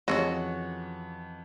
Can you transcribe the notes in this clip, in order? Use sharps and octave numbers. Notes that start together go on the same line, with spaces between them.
F2 C#3 E3 A#3 F#4 D#5